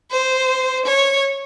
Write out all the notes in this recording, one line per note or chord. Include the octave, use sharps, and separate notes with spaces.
C5
C#5